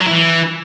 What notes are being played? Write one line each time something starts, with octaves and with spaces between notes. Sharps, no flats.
F#3
E4
E3